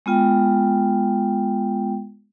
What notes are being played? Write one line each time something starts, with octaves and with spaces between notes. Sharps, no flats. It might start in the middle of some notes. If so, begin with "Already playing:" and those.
G#3 B3 F4 G5